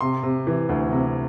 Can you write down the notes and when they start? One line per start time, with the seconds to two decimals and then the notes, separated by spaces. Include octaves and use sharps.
0.01 C3 C6
0.23 C3
0.47 E3
0.69 D2
0.92 C3